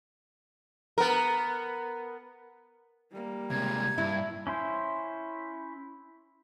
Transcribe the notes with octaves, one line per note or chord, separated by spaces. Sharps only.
B3 A#4
G3 A#3
C3 G#3 G#6
G2 E4
C#4 E4 C5